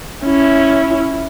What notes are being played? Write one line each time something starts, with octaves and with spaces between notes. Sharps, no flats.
C#4 E4